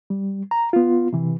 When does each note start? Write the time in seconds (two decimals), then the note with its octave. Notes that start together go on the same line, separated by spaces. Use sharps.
0.10 G3
0.51 A#5
0.73 B3 F4
1.13 C3 E3